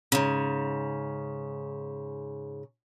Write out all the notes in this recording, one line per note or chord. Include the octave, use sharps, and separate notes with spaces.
G#2 C#3